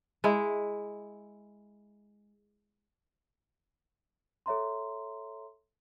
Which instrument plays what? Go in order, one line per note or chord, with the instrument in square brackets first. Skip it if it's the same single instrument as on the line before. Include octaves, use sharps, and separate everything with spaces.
[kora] G#3 E4
[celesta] A4 C#5 E5 A#5 C6